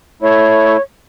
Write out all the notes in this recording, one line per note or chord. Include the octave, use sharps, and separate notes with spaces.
A3 E4 C#5